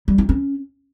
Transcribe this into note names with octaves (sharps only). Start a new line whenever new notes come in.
G3
D#4
C#4